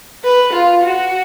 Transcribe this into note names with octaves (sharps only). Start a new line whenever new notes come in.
B4
F4
F#4